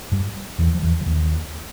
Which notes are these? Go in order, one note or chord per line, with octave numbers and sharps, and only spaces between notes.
G2 G3
E2 E3
F3
E2 E3
E3
D#2 D#3